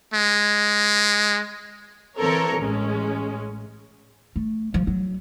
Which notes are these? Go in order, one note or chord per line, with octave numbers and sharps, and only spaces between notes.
G#3
E3 C4 A4 A#4 C#5
A1 G#3 C#4
A3
F3
F#3